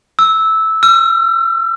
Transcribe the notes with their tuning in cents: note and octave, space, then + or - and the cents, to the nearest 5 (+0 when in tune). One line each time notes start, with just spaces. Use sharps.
E6 -10
E6 +45